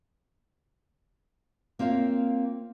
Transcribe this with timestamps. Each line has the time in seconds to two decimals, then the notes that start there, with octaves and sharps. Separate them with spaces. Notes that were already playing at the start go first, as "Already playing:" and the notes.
1.79 A#3 C4 F4 C#5 F5